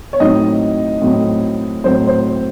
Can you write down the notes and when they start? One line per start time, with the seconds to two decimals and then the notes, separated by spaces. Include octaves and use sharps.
0.13 C#5
0.20 A2 F#3 C4 D#4 D#5
1.02 A2 F#3 C4
1.84 A2 F#3 C4 C5
2.07 C5